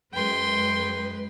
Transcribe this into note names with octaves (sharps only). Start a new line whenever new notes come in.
F#2 G#3 B4 G5 C6